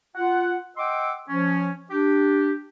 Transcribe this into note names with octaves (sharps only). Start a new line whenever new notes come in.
F4 F#5
D#5 F#5 G5 C6 D6 E6
F3 C#4
D4 G4